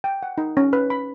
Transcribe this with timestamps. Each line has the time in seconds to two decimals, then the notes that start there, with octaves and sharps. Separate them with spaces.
0.04 G5
0.23 F#5
0.38 D#4
0.57 C#4
0.73 B4
0.90 B5